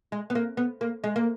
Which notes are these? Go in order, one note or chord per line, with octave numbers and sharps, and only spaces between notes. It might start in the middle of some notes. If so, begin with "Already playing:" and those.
G#3
B3
A#3
B3
A#3
G#3
A#3